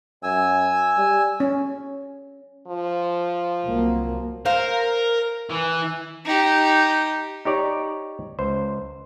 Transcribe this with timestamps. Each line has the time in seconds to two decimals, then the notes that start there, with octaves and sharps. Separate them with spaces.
0.23 F#2 G#5 E6
0.97 G3
1.40 C#4
2.67 F3
3.64 C2 F#3 A#3
4.45 A#4 C5 F5
5.50 E3
6.25 D#4 G4
7.45 D#4 G4 C#5 D5
8.39 C#2 C5